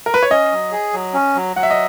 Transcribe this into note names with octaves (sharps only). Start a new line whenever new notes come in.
A#4
B4
C#5
C#4 D#5
F#3
G#4
F#3
C#4
F#3
F#3 F#5
E5
D#5